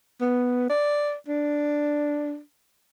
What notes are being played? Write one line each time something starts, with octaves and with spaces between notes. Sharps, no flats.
B3
D5
D4